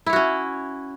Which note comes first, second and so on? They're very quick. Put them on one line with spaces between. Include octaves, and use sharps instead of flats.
E4 C#5 F#4 C#4